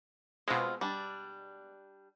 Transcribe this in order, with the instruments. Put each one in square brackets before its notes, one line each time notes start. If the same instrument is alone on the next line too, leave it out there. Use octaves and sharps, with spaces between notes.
[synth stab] B2 G#3 [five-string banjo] C4 F4
[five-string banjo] G3 D4